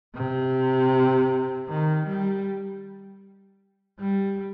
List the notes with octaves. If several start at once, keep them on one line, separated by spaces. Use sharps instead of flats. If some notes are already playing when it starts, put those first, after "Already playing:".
C3
D#3
G3
G3